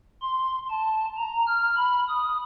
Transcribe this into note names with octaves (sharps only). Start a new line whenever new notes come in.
C6
A5
A#5
F6
B5
D#6